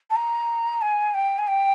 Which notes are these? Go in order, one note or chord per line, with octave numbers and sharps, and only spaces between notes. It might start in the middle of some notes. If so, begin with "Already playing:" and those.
A5
A#5
G#5
G5
G#5
G5